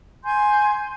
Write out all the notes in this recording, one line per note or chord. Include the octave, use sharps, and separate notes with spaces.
G#5 C6 G6